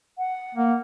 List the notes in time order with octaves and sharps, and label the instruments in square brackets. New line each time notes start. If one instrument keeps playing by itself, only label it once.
[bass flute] F#5
[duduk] A#3